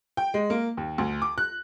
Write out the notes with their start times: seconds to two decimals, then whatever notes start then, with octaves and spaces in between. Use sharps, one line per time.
0.17 G5
0.34 G#3
0.50 A#3
0.77 D#2
0.98 D2
1.22 D6
1.38 F#6